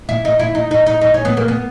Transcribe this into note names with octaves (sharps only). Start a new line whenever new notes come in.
E4
D#4
E4
D#4
D#4
D#4
D#4
C#4
B3
A#3
B3